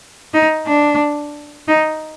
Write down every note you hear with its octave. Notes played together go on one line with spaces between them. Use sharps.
D#4
D4
D#4